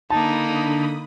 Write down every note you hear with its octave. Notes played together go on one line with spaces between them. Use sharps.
D3 A#3 D#4 A5 B5 D#6